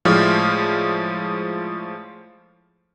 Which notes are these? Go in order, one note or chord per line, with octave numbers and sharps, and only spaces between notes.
A2 F3 G#3 C5 D5 F6